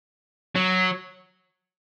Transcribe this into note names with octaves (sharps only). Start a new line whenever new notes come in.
F#3